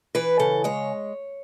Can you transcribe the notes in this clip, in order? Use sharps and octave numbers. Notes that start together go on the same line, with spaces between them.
E3 B4
C#3 A4
G#3 C#5